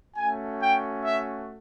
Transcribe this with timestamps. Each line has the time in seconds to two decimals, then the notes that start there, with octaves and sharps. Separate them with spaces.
0.15 A3 C#4 F#4 G#5
0.60 G5
1.03 E5